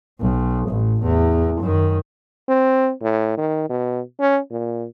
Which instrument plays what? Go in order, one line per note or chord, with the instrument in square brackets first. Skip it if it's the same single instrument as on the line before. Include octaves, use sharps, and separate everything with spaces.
[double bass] B1
A1
E2
F#2 D#3
[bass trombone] C4
A2
D#3
B2
C#4
A#2